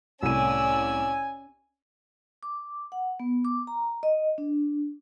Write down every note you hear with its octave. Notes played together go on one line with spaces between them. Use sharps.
C2 A2 C#4 D5 G#5 E6 D#7
D6
F#5
B3
D6
A#5
D#5
D4